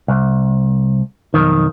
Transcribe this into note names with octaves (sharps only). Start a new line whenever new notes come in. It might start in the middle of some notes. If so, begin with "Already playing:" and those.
C2
B1 F2 D#3